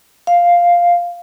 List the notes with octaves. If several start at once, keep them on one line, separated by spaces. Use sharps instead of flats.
F5